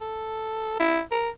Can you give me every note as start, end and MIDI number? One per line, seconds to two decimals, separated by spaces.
0.01 0.75 69
0.80 1.01 64
1.11 1.29 70